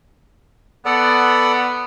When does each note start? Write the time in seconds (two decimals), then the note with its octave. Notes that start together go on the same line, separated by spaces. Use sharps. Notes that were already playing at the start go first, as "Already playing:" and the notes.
0.86 B3 A4 D5 F#5